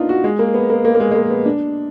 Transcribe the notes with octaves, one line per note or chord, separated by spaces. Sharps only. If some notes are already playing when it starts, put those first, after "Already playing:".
Already playing: A#3 B3 D4 D#4 F4
F#4
G#3
A#3
B3
A#3
A#3
A#3
G#3
G#3
A#3
B3
D4